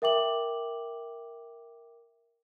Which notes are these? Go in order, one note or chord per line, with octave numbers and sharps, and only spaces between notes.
A#4 E5 G5 D6 F#7